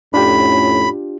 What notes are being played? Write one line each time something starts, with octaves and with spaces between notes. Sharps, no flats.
F2 A2 C#4 D4 F4 G4 B5